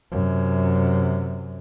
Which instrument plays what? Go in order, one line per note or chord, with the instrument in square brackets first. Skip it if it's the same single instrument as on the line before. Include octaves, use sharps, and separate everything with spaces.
[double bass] F#2 C3